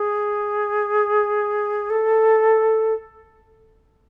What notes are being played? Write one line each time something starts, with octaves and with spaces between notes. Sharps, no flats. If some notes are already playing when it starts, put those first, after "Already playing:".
Already playing: G#4
A4